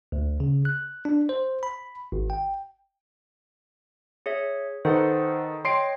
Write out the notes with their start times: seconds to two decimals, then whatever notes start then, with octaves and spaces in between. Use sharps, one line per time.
0.12 D2
0.40 C#3
0.65 F#6
1.05 D4
1.29 C5
1.63 B5
2.12 G#1
2.30 G5
4.26 G#4 C#5 E5
4.85 D#3 A4 B4 C5 F#5
5.65 C#5 D#5 G5 C6 C7 D7